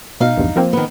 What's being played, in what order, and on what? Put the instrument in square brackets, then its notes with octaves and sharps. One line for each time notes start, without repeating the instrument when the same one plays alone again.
[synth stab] B2 [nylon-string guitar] D#4 F5
[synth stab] A#1 E2 G2
F3 A#3 C4
[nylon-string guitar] D#3 B3